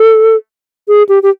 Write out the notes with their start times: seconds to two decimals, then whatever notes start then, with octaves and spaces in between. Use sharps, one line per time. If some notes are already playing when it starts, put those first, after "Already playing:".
Already playing: A4
0.88 G#4
1.09 G4
1.23 G4